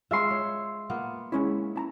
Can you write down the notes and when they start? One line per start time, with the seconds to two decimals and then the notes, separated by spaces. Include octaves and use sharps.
0.11 G#3 F4 E5 C6
0.31 C#5
0.90 A#3 B3 F4
1.32 G#3 C#4 E4
1.76 E4 A5 A#5